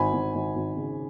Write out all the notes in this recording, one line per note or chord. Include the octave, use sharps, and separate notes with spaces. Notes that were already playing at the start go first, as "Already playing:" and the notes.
Already playing: G#1 G#5 B5
G#1
G#1
G#1
C#3